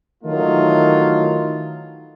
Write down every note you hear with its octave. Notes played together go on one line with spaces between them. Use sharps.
D#3 E3 F#3 A3 D#4 F4